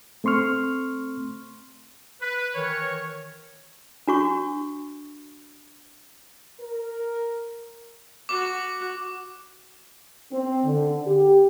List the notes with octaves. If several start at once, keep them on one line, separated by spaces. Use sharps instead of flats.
A3 C4 C6 C#6 F6
B4
D#3 E3 A#4 C#5
D4 F#4 C#6
A#4
F#4 D6
C4
D3
G4